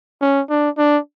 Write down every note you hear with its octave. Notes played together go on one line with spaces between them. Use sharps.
C#4
D4
D4